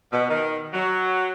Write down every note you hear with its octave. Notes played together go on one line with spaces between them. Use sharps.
B2
D#3
F#3